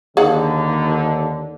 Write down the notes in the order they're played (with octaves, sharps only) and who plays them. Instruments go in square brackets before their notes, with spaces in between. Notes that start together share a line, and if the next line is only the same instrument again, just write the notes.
[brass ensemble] D#2 D3 [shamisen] G#4 F5 F#5